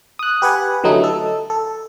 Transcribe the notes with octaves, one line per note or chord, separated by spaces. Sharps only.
D#6 F#6
G4 B4 F#5 G#5
D3 F#3 A3 D#4 E4
A4
A4